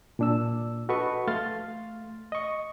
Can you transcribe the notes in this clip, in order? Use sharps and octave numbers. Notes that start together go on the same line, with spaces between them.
A#2 D4 E6
F#4 A4 B4 D#5 C#6
A3 F5 C6 F6 A6
D#5 C#6